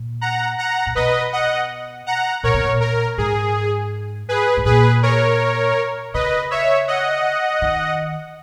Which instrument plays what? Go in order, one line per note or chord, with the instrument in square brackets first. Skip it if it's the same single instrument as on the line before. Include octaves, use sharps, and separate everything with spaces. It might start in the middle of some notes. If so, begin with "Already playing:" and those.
Already playing: [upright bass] A#2
[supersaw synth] F#5 A#5
F#5 A#5
[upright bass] A#2
[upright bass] B2 [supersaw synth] B4 D#5
[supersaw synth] D#5 F#5
F#5 A#5
[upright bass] A#2 [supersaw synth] A#4 C#5
[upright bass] B2
A#2
[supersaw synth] A#4
[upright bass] G#2 [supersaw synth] G#4
[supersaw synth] G#4 B4
[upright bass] G#2
[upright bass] A#2 [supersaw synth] G#4 B4
[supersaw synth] A#4 C#5
[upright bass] C#3 [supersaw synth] B4 D#5
[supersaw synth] C#5 E5
D#5 F#5
[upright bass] D#3